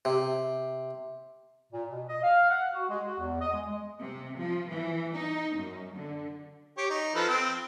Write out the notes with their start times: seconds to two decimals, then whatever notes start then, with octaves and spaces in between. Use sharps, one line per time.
0.05 C3
1.73 A#2
1.90 B2
2.08 D#5
2.23 F5
2.49 F#5
2.73 F#4
2.89 G#3
3.06 F#4
3.19 E2
3.40 D#5
3.53 G#3
3.69 G#3
3.99 C3
4.37 F3
4.69 E3
5.13 D#4
5.56 F#2
5.95 D3
6.77 G4 C#5
6.90 D#4
7.15 F3 A4 B4
7.29 C4